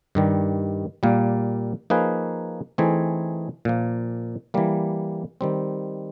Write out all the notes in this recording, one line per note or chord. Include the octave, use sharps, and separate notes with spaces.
G2 D#3 G3
A#2 G3 A#3
F3 A#3 D#4 G#4 B4
E3 A3 C4 D#4 G#4
A#2 F3 A#3
E3 G3 A#3
D#3 G3 C4